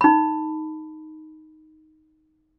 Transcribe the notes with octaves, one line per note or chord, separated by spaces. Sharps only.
D#4 B5